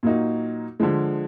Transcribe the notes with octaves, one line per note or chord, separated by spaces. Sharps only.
A#2 F#3 A#3 D#4 F#4
D3 F3 G#3